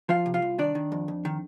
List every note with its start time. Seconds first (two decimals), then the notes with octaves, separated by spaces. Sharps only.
0.09 F3 F4 F5
0.26 C3
0.34 F4 F5
0.42 C2
0.58 D#3 D4 D5
0.75 D#3
0.92 F2
1.08 F2
1.25 D#3